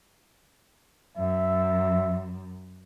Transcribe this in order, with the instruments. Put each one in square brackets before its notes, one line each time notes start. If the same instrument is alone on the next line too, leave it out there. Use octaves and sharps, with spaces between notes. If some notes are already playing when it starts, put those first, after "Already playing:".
[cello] F#2 [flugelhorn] E5